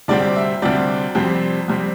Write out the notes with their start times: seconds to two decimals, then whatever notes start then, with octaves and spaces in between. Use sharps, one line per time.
0.08 D2 C3 G3 C4 D5
0.36 E5
0.62 D2 C3 G3 C4 D5
1.15 F2 C3 G3 C4
1.68 F2 C3 G3 C4